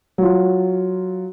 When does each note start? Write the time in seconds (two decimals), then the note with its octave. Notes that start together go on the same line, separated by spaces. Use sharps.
0.18 F#3 F4